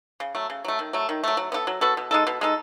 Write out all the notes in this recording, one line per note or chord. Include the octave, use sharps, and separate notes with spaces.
C#3
F#3 A3
C#3
F#3 A3
D#3
F#3 A3
D#3
F#3 A3
F#3
B3 F#4 A4
F#3
B3 F#4 A4
B2
G#3 D#4 A4
B2
G#3 D#4 A4